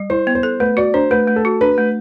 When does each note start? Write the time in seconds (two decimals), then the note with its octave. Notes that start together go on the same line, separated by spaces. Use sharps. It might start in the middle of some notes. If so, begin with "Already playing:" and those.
Already playing: G3
0.10 E4 C5
0.27 B3
0.35 C5
0.43 A4
0.60 A3 B4
0.77 F#4 D5
0.94 D4 C5
1.11 A3 B4
1.28 A3
1.36 A4
1.45 F#4
1.61 D4 B4
1.78 A3